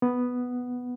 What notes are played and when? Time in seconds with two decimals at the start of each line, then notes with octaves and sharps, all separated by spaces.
0.02 B3